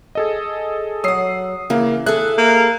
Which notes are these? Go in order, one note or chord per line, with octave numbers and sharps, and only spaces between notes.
G#4 A4 D#5
F#3 F#5 D#6 E6 C7
C#3 E3 A#3 F5
G#4 A4 E5 F#6
A#3